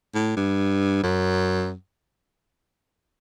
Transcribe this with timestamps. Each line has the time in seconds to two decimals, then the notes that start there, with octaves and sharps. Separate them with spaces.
0.15 A2
0.37 G2
1.04 F#2